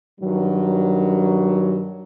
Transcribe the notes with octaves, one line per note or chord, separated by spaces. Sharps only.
G2 D#3 F#3